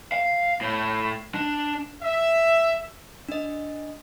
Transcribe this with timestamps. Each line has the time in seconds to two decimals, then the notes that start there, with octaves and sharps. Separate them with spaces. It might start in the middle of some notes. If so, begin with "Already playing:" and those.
0.12 F5
0.61 A2
1.35 D4
2.02 E5
3.29 D4 D#5